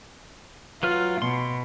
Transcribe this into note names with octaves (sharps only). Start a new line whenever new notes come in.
F#3 F4 B4 F6
B2 C6